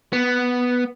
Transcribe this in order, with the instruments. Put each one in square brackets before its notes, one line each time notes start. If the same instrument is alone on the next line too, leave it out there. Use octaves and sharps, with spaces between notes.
[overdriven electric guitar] B3